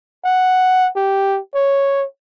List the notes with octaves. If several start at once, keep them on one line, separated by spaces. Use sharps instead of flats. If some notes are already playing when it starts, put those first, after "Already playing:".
F#5
G4
C#5